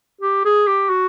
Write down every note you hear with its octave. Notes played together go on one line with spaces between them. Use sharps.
G4
G#4
G4
F#4